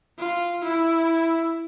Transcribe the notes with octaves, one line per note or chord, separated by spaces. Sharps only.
F4
E4